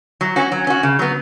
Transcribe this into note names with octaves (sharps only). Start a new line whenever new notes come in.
F#3
C#4 F#4
F#3
C#4 F#4
C#3
F#3 B3